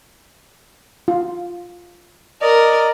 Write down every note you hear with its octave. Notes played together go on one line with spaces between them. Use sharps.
F4
A#4 D5 D#5